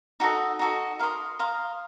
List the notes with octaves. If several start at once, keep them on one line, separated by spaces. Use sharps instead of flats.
D#4 F#4 A4 D#5
D#4 F#4 A4 D#5
A#4 F5 C6 D#6
A#4 F5 C6 D#6